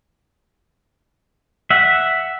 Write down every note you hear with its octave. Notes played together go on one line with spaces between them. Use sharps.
E5 F#5